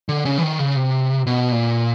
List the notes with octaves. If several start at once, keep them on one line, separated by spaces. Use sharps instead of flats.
D3
C#3
E3
D#3
C#3
C3
B2
A#2